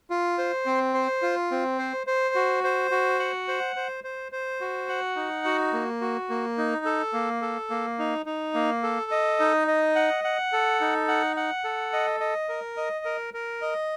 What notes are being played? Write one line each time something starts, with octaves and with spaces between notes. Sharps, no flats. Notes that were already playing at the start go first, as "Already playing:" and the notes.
F4
C5
C4
C5
F4
C4
C5
C5
F#4
C5
F#4
F#5
C5
C5
C5
C5
F#4
F#5
D#4
F#4
A#3
F#4
A#3
D#4
A4
A#3
A4
A#3
D#4
D#4
A#3
A4
D#5
D#4
D#5
F#5
F#5
A4
D#4
F#5
F#5
A4
D#5
D#5
A#4
D#5
A#4
A#4
D#5